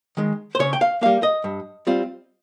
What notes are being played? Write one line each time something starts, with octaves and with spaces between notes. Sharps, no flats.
D#3 G#3
C5
C#3 C#5
G5
F5
G3 A#3 F5
D#5
G2
G3 C4 F4